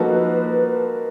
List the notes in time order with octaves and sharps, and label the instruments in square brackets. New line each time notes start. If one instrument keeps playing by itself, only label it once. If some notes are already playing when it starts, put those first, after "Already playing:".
Already playing: [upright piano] F3 A#3 D#4 F#4 A4 [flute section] B4